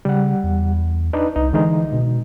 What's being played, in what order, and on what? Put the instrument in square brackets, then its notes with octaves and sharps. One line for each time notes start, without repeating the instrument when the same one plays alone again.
[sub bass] C#3 [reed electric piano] G3 F#5
[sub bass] E2
[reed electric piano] D4 D#4 B4
[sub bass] C2 [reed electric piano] D#4
[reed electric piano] D3 G#3 D#4 [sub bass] E3
[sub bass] B2